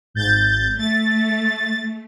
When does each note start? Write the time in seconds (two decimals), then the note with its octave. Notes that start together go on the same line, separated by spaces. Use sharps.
0.14 G#1 G6 A6
0.78 A3 A6